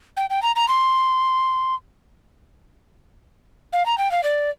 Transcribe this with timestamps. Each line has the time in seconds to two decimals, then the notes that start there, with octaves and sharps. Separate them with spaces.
0.17 G5
0.30 G5
0.43 A#5
0.56 A#5
0.68 C6
3.73 F5
3.86 A#5
3.98 G5
4.11 F5
4.23 D5